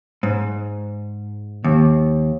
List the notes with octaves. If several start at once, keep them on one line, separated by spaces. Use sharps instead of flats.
G#2
D#2